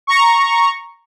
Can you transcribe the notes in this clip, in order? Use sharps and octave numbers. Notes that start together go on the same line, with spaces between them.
A#5 C#6